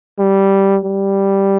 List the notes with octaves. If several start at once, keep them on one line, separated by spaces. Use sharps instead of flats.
G3
G3